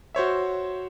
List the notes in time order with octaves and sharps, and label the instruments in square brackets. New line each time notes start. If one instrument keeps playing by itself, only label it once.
[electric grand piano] F#4 C5 C#5 E5